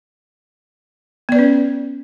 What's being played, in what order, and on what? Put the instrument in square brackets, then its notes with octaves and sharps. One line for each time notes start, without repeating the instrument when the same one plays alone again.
[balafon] B3
D5
B4
C#4